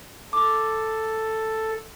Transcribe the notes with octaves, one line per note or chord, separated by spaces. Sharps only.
A4 D6